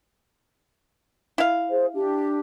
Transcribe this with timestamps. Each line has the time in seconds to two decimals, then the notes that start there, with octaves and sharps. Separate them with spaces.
1.38 E4 F5
1.69 G#4 C5
1.94 D4 G4